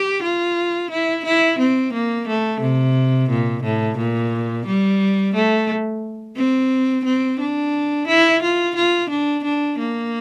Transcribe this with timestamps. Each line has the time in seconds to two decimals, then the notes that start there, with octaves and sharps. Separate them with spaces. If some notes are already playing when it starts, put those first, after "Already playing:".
Already playing: G4
0.23 F4
0.91 E4
1.25 E4
1.59 C4
1.93 A#3
2.28 A3
2.61 C3
3.30 A#2
3.64 A2
3.98 A#2
4.66 G3
5.35 A3
6.36 C4
7.05 C4
7.40 D4
8.08 E4
8.42 F4
8.76 F4
9.10 D4
9.44 D4
9.79 A#3